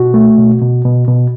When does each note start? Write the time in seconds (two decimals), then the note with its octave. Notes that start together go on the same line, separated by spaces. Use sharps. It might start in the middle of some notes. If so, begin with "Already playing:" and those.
Already playing: B2 F#4
0.14 A3
0.38 B2
0.62 B2
0.85 B2
1.08 B2